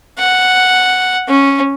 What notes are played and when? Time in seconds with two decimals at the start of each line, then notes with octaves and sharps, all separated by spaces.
0.19 F#5
1.28 C#4